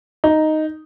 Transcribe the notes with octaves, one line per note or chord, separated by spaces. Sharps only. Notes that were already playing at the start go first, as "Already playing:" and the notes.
D#4